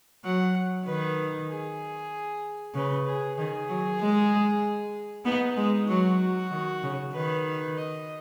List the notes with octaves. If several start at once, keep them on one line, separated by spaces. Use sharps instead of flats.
F#3 F#5
D#3 B4
G#4
C#3 B4
G#4
D#3 G#4
F#3
G#3
B3 D#4
G#3
F#3 F#4
D#3
C#3
D#3 B4
B4
D#5